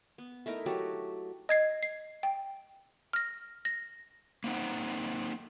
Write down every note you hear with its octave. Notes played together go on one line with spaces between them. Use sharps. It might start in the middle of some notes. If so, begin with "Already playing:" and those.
B3
A3 D#4 E4 A#4
F#3 F#4 G4 A4
D#5 G#6 C7
C7
G5
F6 A#6
A#6
A#3 C4 D#4 F#5